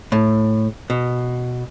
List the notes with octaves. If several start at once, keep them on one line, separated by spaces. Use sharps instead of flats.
A2
B2